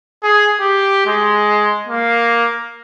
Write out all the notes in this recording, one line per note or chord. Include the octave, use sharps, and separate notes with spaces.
G#4
G4
G#3
A#3